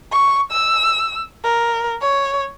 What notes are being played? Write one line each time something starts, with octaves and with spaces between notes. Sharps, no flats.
C#6
E6
A#4
C#5